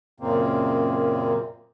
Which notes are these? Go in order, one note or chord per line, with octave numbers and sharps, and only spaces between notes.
F#2 A#2 C#3 A#3 C4